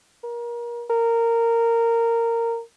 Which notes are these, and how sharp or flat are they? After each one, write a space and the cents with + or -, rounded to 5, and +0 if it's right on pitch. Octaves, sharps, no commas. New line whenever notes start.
A#4 +30
A#4 -15